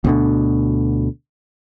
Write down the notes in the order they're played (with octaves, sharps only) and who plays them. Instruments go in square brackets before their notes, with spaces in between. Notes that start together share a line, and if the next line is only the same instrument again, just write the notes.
[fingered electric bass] D2 B2 D3